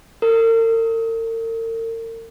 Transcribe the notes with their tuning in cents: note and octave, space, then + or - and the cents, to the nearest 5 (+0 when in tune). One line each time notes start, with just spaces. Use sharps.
A#4 -45